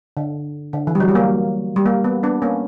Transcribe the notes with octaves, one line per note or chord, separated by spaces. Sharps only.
D3
D3
E3
G3
F#3
G3
A#3
G3
A#3
B3
B3 D4
A#3 C#4